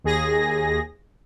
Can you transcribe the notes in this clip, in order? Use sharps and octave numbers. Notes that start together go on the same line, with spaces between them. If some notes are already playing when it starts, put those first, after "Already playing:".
D#2 G#4 A#6